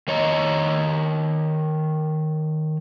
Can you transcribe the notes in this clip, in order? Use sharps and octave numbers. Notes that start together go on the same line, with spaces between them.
D#3 C#5 D#5 A#5